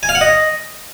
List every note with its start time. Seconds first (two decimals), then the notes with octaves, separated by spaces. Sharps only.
0.03 G#5
0.09 F5
0.15 F#5
0.21 D#5